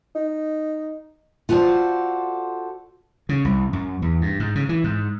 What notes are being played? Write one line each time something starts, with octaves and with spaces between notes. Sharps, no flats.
D#4
F4 F#4 A4 C5 D5
C#3
C2
F#2
E2
G2
G#2
C#3
E3
G#2